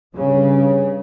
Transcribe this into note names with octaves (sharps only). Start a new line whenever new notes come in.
G2 C#3